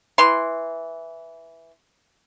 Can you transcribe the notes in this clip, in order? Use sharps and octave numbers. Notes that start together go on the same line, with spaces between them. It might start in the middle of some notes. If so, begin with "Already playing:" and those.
E3 C6